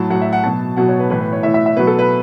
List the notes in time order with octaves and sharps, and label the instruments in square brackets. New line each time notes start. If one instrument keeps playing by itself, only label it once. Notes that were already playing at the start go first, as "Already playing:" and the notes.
Already playing: [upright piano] A2 F#3 A5
A2 F#3 F#5
E5
F#5
B2 F#3 A5
B2 F#3 F#5
C#5
B4
A2 E3 B4
B4
C#5
A2 E5
E3
E5
E5
B2 F#3 B4
A4
B4